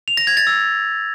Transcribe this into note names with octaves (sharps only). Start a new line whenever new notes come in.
F7
A#6
G#6
A6
E6